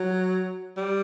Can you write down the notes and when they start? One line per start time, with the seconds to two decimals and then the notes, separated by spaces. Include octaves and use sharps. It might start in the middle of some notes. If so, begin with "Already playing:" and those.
Already playing: F#3
0.77 G3